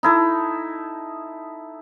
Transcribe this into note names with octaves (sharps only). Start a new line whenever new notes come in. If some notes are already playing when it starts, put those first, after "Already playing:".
D#4 E4 A4